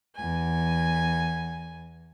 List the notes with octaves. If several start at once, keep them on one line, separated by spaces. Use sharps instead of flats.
E2 G#5